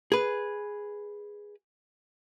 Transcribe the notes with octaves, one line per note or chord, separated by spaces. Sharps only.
G#4 B4